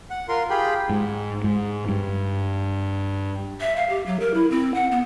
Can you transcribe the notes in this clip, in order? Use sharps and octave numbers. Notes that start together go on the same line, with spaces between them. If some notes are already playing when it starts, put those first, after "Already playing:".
F#5
F4 A#4 C6
F4 G4 G#4 G5 B5
G#2
G#2
G2
E5
F5
G4
F#3
A#4
E4
C4
F#5
B3